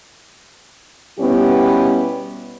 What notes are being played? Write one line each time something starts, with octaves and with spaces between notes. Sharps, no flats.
B2 G3 B3 C#4 E4 G4